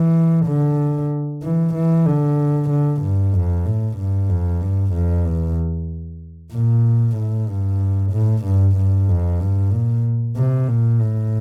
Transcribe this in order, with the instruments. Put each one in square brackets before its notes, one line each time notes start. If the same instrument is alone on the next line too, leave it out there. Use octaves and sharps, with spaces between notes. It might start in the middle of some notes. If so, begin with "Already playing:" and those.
Already playing: [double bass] E3
D3
E3
E3
D3
D3
G2
F2
A2
G2
F2
G2
F2
E2
A#2
A2
G2
A2
G2
G2
F2
G2
A#2
C3
A#2
A2